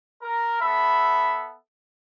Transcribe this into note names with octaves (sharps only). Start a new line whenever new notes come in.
A#4
B3 A4 E5 B5